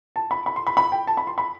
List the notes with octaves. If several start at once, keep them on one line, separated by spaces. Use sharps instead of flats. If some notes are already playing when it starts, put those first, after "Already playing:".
A5
B5
B5
C6
B5
B5
G5
A5
B5
C6
B5